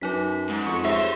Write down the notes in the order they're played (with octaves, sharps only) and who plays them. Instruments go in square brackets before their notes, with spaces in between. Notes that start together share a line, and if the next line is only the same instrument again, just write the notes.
[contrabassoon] F#2 [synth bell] F#3 D#4 B6
[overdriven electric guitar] G#2
[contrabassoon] F2 [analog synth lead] C#6
[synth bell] G4 G#4 [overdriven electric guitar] C5 C#5 [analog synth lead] E5